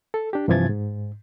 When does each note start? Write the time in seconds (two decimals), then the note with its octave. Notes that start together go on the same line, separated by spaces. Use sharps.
0.14 A4
0.33 D4 G4
0.48 G2 C3 E3 F3 G#6 A6
0.69 G#2